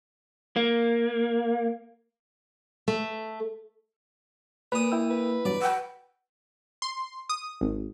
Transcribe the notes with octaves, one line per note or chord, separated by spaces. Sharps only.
A#3
A3
A#2 B4 D#6
E4 G5 E6
B4
E2 G2 F#3 D5
F#5 G5 E6
C6
D#6
G#1